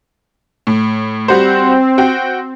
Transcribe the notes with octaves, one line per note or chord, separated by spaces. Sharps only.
A2
G3 C4 F#4 C5
F#4 G5